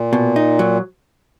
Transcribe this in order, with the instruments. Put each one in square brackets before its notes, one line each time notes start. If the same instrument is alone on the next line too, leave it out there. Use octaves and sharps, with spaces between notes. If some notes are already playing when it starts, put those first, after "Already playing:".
Already playing: [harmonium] A#2
[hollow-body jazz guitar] B2
D#4
F#3